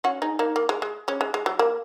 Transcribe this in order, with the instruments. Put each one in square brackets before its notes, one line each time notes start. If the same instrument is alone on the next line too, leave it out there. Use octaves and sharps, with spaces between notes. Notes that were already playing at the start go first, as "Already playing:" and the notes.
[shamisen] C#4 F#4
D#4 G#4
A#3 D#4
A#3
G#3
G#3
G#3 C#4
G#3
G#3
F#3
A#3